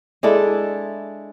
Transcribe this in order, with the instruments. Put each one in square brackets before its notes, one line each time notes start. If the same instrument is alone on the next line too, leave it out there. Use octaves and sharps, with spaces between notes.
[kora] G#3 D4 E4 A4